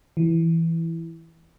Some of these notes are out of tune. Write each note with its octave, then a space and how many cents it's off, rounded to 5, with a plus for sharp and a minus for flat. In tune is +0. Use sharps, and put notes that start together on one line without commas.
E3 +0